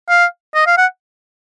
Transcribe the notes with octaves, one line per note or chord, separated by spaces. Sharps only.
F5
D#5
F5
F#5